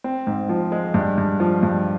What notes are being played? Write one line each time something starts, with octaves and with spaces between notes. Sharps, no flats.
C4
G#2
F3
G#3
G2
G2
F3
G2